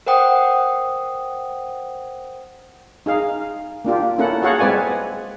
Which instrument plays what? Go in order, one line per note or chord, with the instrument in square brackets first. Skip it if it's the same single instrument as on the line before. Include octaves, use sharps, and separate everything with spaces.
[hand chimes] A#4 C5 F#5 G5 D#6
[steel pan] D#4 G#4 F5
A#3 D4 F4 G4
A#3 C#4 E4 A4 F#5
F#4 G#4 A4 C#5 F5 F#5
G#3 C4 B4 D5 G#5